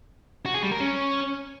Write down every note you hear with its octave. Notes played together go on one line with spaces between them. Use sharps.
F#4
G#4
G3
A#4
C#4